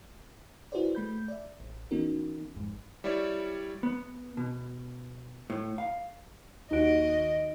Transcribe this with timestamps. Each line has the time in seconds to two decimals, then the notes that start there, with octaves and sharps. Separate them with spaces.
0.72 E4 F#4 G#4 B4 C5 D5
0.95 A3 B5 G6
1.28 D5 E5
1.60 A1
1.91 E3 B3 C#4 D#4 F#4 A#4
2.56 G#1 F2 G#2
3.04 G3 E4 C#5 D5
3.83 B3
4.37 B2
5.50 A2
5.78 F5
6.71 D#2 D#4 F#4 D#5 D7